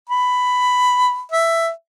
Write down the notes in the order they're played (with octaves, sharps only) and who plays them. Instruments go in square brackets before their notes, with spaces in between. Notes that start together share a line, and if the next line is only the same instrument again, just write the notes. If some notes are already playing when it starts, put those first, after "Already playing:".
[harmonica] B5
E5